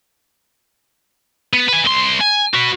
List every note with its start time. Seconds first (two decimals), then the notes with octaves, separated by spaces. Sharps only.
1.53 B3
1.68 B4 G#5
1.84 C2 C6
2.20 G#5
2.54 F#4 B4